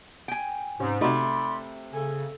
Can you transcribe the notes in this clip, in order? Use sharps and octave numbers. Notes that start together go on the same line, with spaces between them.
G5 G#5
G#2 C3 C#4
C3 A3 D#4 F#4 D5 B5 C6
C#3 A4 G#5